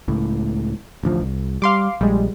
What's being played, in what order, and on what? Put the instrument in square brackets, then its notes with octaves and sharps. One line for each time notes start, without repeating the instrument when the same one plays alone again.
[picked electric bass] C#2 A2
A1 D2 F3
C2
[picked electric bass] G3 [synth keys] F5 C6 D6
[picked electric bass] A#1 [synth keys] G3 G#3